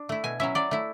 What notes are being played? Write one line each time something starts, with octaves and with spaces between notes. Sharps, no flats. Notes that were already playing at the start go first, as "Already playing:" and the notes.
Already playing: D4
A3 E4
B2 G#5
F#3 C#4 E4 E5
F#3 D5
A3 E4